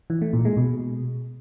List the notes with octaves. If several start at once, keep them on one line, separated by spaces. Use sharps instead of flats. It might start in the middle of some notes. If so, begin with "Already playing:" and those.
E3
A3
A#2
G#3
B2